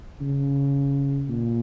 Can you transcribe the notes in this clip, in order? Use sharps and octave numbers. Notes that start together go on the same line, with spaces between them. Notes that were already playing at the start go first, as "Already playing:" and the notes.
C#3
A#2